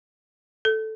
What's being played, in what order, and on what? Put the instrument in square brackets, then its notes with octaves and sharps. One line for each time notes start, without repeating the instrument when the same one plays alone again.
[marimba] A4